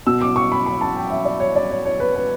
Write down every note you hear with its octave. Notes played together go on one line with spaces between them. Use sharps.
B2 E6
D6
C#6
B5
B5
A5
G5
E5
D5
C#5
D5
C#5
C#5
B4
B4